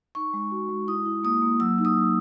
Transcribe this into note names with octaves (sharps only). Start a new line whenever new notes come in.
D#4 C#6
G#3
F#4
G#3
E4 D#6
E4
A#3 D#6
A#3
F#3 E6
D#4
D#6
F#3